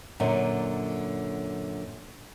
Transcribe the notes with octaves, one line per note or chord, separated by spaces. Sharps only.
F#2 A#2 D3